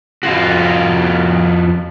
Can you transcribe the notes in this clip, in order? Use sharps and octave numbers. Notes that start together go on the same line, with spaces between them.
F2 F4 F#4